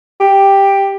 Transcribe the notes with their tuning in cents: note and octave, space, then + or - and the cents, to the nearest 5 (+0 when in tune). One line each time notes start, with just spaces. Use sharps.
G4 +5